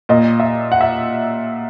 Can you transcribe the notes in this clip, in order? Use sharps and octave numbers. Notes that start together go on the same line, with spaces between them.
A#2 D#5
E5
F#5
E5